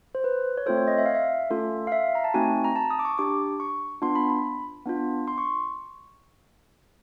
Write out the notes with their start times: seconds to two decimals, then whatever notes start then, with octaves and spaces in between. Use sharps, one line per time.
0.15 C5
0.24 B4
0.58 C#5
0.66 A3 C4 F4 A4 C5
0.77 C#5
0.87 D#5
0.98 E5
1.06 F5
1.15 E5
1.50 A3 C#4 F4 A4
1.87 F5
1.92 E5
2.15 A#5
2.24 A5
2.34 A3 C4 D#4 F#4 G#5
2.64 A#5
2.76 A5
2.90 D#6
2.99 D6
3.05 C#6
3.18 D4 G4 D6
3.60 C#6
4.02 B3 D4 F4 C6
4.15 B5
4.30 B5
4.86 B3 D4 F4
5.28 C6
5.38 C#6